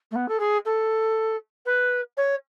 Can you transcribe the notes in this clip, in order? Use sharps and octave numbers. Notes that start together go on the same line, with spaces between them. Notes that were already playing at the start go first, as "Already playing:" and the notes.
A3
B3
A4
G#4
A4
B4
C#5